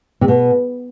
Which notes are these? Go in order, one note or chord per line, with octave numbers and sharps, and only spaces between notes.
C3
B2